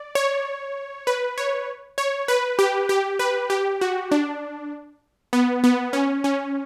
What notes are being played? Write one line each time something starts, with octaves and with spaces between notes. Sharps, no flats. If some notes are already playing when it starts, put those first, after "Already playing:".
Already playing: D5
C#5
B4
C#5
C#5
B4
G4
G4
B4
G4
F#4
D4
B3
B3
C#4
C#4